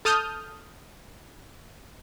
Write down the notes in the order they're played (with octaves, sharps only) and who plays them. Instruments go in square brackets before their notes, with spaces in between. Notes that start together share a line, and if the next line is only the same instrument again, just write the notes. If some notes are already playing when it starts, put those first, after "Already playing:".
[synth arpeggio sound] A4 A5 D#6 F6 G6